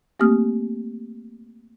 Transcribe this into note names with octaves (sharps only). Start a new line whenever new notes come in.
A3 A#3 C4 G4 D#6 F6